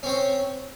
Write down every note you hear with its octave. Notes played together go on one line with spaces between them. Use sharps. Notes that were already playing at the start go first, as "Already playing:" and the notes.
C4 C#4 C#5